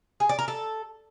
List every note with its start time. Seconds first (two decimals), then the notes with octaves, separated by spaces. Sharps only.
0.20 G#4
0.29 D5
0.39 A#4
0.48 A4